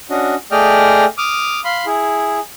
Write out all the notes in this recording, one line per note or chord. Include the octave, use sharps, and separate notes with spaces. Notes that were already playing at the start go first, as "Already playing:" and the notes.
C#4 D4 F#4 D#5
A3 G#4 D5 D#5 G5 F6
D6 D#6 F6
F5 B5 C6
E4 G#4